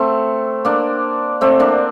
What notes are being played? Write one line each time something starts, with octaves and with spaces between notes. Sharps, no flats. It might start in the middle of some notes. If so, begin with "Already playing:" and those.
Already playing: A3 C4
A#3 D4
A3 C4
A#3 D4